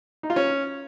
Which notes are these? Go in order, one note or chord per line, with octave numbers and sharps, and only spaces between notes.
D#4
F4
C#4